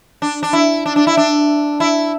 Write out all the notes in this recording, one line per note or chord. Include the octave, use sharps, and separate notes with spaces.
D4
D4
E4
D4
D4
E4
D4
E4